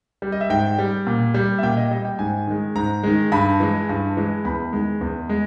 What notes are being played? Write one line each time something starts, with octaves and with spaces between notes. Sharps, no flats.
G3
D#5
E5
G#2 G5
G3
A#2
G3
E5
A#2 G5
D#5
G3 D#5
G5
G#2 G#5
D#3 G#3
G#2 A#5
D#3 G#3
G2 B5
E3 G#3
G2
E3 G#3
E2 B5
D#3 G#3
E2
G#3